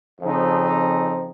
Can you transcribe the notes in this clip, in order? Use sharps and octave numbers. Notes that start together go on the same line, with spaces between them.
F2 C#3 F3 C4 D#4